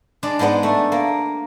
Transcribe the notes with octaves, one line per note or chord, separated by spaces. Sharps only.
G#3 D4 D5
G#2 G#3 B3 D4
A3
A#3